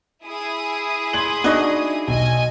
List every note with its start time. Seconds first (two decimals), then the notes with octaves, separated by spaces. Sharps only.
0.24 E4 G#4 D#6
1.13 C6 G#6 F#7
1.44 D4 D#4 F#4 D#5 C#6
2.08 B1 D#5 G#5